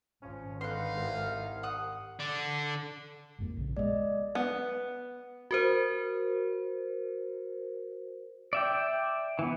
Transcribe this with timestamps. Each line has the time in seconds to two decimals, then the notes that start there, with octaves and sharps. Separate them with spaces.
0.23 G#1 F3 C#4
0.61 D3 B3 D#4 F5 F#5 C6
0.96 C2
1.63 F#5 D#6
2.20 D3 D4
3.39 G#1 F2 A#3
3.57 A#1 C#3
3.77 G#3 B3 D5 D#5
4.35 B3
5.51 F#4 A#4 C5
8.53 D5 E5 G5
9.39 E3 B3